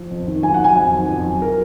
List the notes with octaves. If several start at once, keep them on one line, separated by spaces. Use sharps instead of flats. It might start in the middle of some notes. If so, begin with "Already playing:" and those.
Already playing: F3
F2
D#3
F#3 G#5
F#3 F#5
G#5
F2 G#5
D#3
F2
F#3
A#4